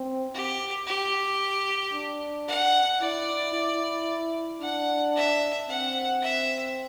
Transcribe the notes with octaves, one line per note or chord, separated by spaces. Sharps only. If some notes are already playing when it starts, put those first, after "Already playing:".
Already playing: C4
G4
G4
D4
F#5
E4 D5
E4
D4 F#5
E5
C4 F#5
E5